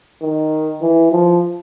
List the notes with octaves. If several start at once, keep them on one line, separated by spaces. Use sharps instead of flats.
D#3
E3
F3